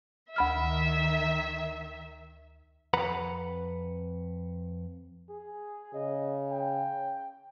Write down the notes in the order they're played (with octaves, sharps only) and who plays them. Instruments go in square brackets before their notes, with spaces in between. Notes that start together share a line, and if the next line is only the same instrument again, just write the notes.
[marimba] D2 B5 F6 [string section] D#3 E5
[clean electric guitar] F2 B4 F#5 A#5 B5
[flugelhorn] G#4
[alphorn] C#3 [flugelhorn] D#5
[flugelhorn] G5